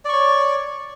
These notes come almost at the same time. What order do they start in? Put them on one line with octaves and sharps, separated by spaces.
D5 C#6 C#5